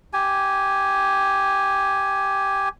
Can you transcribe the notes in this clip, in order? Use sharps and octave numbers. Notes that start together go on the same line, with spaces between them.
G4 G#5